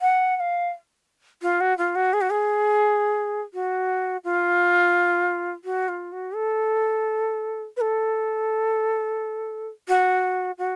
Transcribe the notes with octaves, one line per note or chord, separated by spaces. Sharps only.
F#5
F#5
F5
F4
F#4
F4
F#4
G#4
F#4
G#4
F#4
F4
F#4
F4
F#4
A4
B4
A4
F#4
F#4